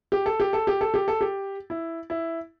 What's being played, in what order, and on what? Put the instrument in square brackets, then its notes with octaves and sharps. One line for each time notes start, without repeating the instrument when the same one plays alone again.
[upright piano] G4
A4
G4
A4
G4
A4
G4
A4
G4
E4
E4